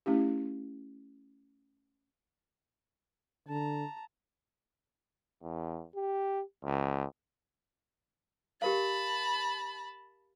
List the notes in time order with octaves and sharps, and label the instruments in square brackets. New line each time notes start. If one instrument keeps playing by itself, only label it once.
[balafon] A3 C#4 E4 G4
[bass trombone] D3 [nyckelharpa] A5 A#5
[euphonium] E2
G4
C#2
[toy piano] G4 A#4 F5 [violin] A5 B5